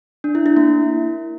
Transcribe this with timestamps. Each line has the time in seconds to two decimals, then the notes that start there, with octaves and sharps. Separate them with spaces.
0.24 D4
0.35 E4
0.46 E4
0.57 A#3